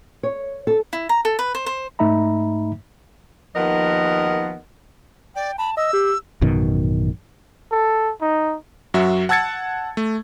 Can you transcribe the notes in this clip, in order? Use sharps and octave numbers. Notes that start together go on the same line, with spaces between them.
C#5
A4
E4
A#5
A4
B4
C5
C5
G#2 A3 D#4 E5 A#5 B5
D#2 F3 B3 A#4 D#5 F#5
D5 G5
A5 B5
D#5 E6
G4
A1 F#2 B2 D#3
A4
D#4
F#2 F#3 F#4 E5
F#5 A5 E6 G#6 A6 C#7
A3